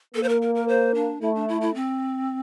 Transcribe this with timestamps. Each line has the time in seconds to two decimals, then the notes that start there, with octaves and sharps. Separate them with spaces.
0.15 A#3 A4
0.23 C5
0.29 A#4
0.42 A#4
0.55 A#4
0.68 C5
0.95 D4
1.21 A3 E4
1.35 D4
1.48 E4
1.61 E4
1.75 C4